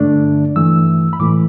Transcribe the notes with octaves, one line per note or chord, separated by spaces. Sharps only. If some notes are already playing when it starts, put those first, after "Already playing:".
Already playing: G2 D3 A3 D4
G2 E3 A3 E6
B5
A2 E3 A3 D6